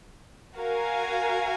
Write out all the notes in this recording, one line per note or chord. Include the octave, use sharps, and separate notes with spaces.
F#4 A#4 F5 G#5